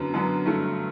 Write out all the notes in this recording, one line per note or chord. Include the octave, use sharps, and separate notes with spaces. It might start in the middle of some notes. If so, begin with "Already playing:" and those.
Already playing: F#2 D3 F#3 B3
F#2 D3 F#3 B3
G2 D3 F#3 A3